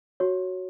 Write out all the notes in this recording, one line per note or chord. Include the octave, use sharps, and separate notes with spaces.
F#4 C#5